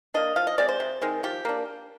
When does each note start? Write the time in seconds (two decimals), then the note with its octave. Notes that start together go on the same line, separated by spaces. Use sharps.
0.14 A#3 D4 D#5
0.36 F3 F5
0.47 D#5
0.58 G#3 C4 D5
0.69 C5
0.80 C3
1.01 D#3 G#3 C4
1.23 F3 G4
1.45 A#3 D4